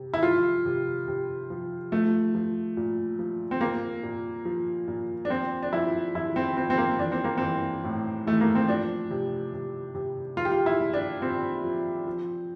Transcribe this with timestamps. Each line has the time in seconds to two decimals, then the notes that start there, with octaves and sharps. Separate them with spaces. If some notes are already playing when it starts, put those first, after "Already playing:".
Already playing: C3
0.14 E4
0.22 F3 F4
0.65 C3
1.07 C3
1.50 F3
1.92 F3 A3
2.35 F3
2.77 A#2
3.19 F3
3.51 C4
3.61 A#2 A#3
4.03 A#2
4.45 F3
4.88 A#2
5.25 D4
5.29 F3 C4
5.63 D4
5.73 F3 E4
6.15 F3 E4
6.36 C4
6.57 F3 C4
6.70 C4
6.78 A#3
6.99 E3 D4
7.12 C4
7.24 A#3
7.38 E3 C4
7.84 A2
8.26 E3 A3
8.40 A#3
8.55 C4
8.68 F3 D4
9.10 C3
9.53 C3
9.95 C3
10.37 F3 F4
10.45 G4
10.52 F4
10.66 E4
10.79 A#2
10.94 D4
11.22 A#2 C4
11.64 F3
12.07 F3